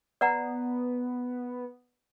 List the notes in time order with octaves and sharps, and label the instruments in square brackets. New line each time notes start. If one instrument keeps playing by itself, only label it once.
[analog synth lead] B3 [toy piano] D5 F#5 A#5